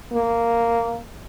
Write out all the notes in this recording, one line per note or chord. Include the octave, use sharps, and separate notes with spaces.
A#3